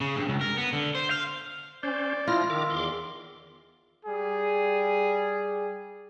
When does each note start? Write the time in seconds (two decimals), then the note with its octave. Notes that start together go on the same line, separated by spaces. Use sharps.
0.01 C#3
0.17 G2
0.29 C#2
0.41 A#4
0.58 B3
0.73 D3
0.95 C5
1.11 F5
1.83 C#4 C5 D5
2.28 F3 E4 F4 F6 A#6
2.50 D#3 A#4 E5 D6
2.70 E2 C6 D6
4.06 G3 G#4